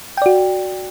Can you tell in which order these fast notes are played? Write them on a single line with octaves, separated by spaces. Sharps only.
G5 D5 F#4